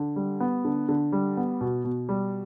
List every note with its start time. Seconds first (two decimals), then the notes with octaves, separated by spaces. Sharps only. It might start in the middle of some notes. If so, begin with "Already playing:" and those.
Already playing: D3
0.16 G3
0.40 B3
0.65 D3
0.89 D3
1.12 G3
1.37 B3
1.61 B2
1.84 B2
2.09 G3